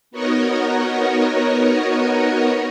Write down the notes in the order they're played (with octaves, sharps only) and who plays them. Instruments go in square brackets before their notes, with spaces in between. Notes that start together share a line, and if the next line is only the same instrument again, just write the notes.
[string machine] B3 D#4 F#4 A#4 C#5 D#5